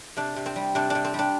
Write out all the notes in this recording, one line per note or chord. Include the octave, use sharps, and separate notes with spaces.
C3 D4
C3
C4
G3
C3 D4
D4
C3
C4
G3 D4